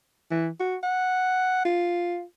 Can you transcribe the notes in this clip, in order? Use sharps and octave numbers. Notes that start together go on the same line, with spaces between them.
E3
F#4
F#5
F4